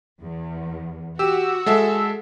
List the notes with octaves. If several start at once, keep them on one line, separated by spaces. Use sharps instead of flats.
E2
F#4 G4 E6
G#3 A4 E5